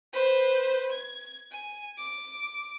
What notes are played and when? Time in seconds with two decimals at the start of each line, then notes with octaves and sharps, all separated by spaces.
0.13 B4 C5
0.92 G#6
1.52 G#5
1.98 D6